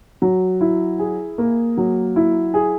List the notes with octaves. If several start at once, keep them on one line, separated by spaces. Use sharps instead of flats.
F#3
E4
G#4
A#3
F#3
E4
G#4